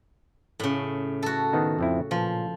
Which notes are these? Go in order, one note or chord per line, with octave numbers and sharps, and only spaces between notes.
A2 C#3
F#4 A4
D#3 B3 D#4
F2 C4 E4
A#2 F3 F4